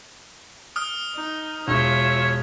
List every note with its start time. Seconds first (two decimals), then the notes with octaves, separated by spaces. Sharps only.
0.76 D#6 F6
1.15 D#4
1.68 E1 F4 C#5 E5